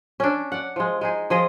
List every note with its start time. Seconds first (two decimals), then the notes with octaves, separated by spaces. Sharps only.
0.20 C#4 D4
0.52 D5 F#5
0.76 F3 G#3
1.01 G#3 D#4 G#4
1.30 F3 G#4 D#5